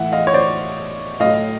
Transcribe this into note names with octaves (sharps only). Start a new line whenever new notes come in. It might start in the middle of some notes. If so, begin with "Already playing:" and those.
Already playing: A2 E3 E5 F#5
D#5 F5
C#5
C5 D5
A2 F#3 D#5 F5